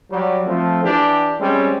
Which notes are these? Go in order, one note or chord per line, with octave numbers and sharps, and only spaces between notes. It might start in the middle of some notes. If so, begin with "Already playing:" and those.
F#3 G3
F3 A3 C4
E3 D4 G4
G3 G#3 C4 C#4